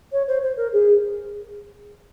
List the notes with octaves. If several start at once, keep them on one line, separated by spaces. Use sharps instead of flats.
C#5
C5
C5
A#4
G#4